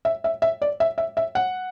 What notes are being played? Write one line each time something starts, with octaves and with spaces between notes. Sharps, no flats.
E5
E5
E5
D5
E5
E5
E5
F#5